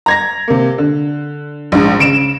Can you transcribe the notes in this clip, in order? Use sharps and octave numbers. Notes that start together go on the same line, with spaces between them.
A#5 G#6 A#6
C3 A#3
D3
A#1 G#2
C#3 D7 E7